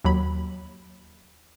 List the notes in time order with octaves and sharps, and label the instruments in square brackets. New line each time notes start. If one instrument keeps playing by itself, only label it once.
[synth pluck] D#2 F#3 B5